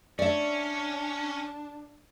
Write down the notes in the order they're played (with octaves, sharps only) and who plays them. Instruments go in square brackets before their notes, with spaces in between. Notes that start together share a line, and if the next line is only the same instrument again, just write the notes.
[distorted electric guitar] C#4 [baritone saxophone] D4 [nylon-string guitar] D5 E5